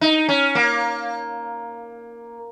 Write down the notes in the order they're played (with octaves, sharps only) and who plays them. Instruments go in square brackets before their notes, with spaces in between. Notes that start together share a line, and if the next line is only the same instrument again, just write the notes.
[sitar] D#4
C#4
A#3